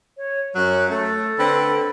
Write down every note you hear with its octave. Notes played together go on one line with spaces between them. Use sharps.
C#5
F#2 F#3 F#6
A3 A4
D3 C4 B4